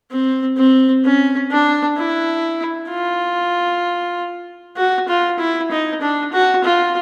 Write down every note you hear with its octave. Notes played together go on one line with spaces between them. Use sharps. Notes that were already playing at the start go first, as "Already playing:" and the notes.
C4
C4
C#4
D4
E4
F4
F#4
F4
E4
D#4
D4
F#4
F4